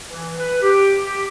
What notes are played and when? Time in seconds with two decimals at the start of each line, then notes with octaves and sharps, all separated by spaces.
0.05 E3
0.39 B4
0.62 G4
1.04 G4